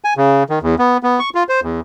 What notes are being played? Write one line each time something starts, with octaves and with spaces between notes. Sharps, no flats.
G#5
C#3
D#3
E2
B3
B3
C#6
F4
C5
E2